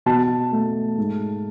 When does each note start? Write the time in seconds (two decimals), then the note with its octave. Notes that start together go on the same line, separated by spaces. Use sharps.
0.06 B2 A5
0.52 A3
0.97 G#2